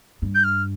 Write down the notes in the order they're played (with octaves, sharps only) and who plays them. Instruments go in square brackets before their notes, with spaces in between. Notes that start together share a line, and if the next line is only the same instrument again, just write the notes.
[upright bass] G2
[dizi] G6
F6